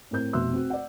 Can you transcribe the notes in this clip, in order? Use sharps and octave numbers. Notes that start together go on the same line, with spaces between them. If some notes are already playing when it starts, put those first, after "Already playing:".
A2 C4 A#4 G6
F1 B2 E5 C6 E6 F#6
C4 F#4
D5 F#5